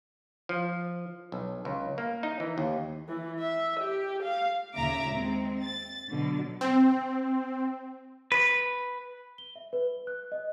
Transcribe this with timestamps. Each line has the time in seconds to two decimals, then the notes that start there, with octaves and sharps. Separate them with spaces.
0.49 F3
1.32 B1
1.65 C#2
1.98 A#3
2.23 D#4
2.40 E3
2.58 D#2
3.08 E3
3.40 E5
3.80 G4
4.23 F5
4.75 D#2 A#2 C#3 E5 A#5 D6
5.09 G#3 C4
5.63 A6
6.09 B2 D3 F#3
6.61 C4
8.32 B4
9.38 G7
9.56 E5
9.73 B4
10.07 F#6
10.32 D#5